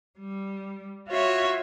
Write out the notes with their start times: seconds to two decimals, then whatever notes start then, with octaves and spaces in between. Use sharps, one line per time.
0.18 G3
1.09 F4 F#4 C#5 E5